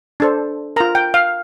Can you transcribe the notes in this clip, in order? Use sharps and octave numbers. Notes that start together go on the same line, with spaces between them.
D4 A4 C5
F4 A#4 A#5
G5
F5